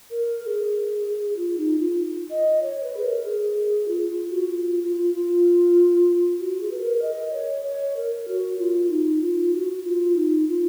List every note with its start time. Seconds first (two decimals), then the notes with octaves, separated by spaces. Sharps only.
0.10 A#4
0.43 A#4
0.46 G#4
1.36 F4
1.57 D#4
1.78 F4
2.30 D#5
2.62 C#5
2.83 B4
2.97 G#4
3.04 A#4
3.25 G#4
3.88 F4
4.09 F4
4.30 F#4
4.51 F4
4.82 F4
5.13 F4
6.39 F#4
6.60 G#4
6.71 B4
6.81 A#4
7.02 D#5
7.33 C#5
7.64 C#5
7.96 A#4
8.28 F#4
8.59 F4
8.90 D#4
9.21 F4
9.53 F#4
9.84 F4
10.16 D#4
10.47 F4